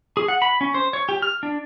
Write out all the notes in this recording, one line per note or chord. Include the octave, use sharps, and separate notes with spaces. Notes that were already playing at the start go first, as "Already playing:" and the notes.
G#4
F#5
B5
C#4
C5
C#5
G4
F6
D4